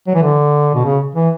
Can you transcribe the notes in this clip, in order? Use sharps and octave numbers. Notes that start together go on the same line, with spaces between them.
F#3
E3
D3
B2
C#3
E3